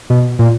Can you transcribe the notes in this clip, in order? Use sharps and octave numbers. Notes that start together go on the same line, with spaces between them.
B2
A#2